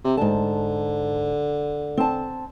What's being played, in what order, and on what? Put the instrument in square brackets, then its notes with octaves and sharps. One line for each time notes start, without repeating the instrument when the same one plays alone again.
[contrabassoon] C3
[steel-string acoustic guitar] G#2 A5 [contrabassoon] D3
[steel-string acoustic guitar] C4 A5